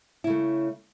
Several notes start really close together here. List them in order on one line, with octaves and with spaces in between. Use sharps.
E4 C#3 A3